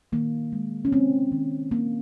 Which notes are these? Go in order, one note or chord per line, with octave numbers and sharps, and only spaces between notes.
D#3 A#3
G#3
C#4
G#3 C4
D#3
A#3